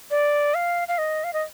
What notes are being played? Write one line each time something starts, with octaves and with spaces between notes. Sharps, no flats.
D5
F5
F5
D#5
F5
D#5